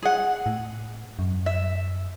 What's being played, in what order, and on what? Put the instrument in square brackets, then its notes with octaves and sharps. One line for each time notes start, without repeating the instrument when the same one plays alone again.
[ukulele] G#4 F#5
[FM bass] A2
F#2
[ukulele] E5